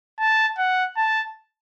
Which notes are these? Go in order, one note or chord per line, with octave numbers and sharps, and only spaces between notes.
A5
F#5
A5